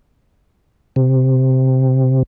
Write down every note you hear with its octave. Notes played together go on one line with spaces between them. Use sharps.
C3